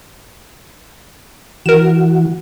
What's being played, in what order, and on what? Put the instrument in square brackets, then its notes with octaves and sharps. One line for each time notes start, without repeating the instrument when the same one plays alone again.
[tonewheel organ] E3 F#4 [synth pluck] A#4 E7